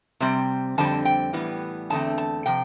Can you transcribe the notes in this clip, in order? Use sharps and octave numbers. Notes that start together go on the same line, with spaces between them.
C3 G3 C4
F2 D3 G3 C4 A5
G5
A2 E3 G3 B3
E2 D3 A3 C4 A5
A5
C3 F3 G5